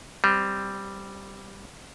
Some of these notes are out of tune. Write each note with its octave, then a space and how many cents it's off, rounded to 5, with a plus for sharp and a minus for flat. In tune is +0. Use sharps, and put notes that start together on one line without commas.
G3 +0 C4 +0